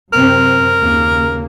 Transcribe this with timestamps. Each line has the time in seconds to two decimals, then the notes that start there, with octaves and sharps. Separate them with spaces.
0.13 F#2 C3 C4 A#4
0.79 D#2 C#3 A#3